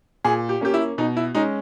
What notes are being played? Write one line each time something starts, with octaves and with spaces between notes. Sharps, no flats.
A#2 G#4
G4
A#3 C#4 G4
E4
B2 D#4
E4
G#3 C#4 D#4